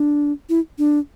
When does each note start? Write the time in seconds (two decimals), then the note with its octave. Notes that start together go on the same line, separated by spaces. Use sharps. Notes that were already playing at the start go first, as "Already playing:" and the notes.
Already playing: D4
0.49 E4
0.78 D4